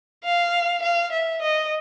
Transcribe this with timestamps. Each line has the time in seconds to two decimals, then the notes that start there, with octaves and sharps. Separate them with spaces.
0.24 F5
0.83 F5
1.12 E5
1.42 D#5